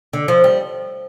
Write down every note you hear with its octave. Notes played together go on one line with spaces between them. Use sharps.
D3
F3
G3